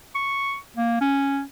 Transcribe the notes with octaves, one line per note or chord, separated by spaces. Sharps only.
C#6
A#3
C#4